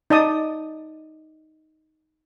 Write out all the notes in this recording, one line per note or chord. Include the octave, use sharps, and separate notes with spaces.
D#4 D5 A5 D#6